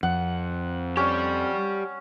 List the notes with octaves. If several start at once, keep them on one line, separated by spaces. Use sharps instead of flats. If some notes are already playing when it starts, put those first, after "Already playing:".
F2 F#5
C#4 G4 D5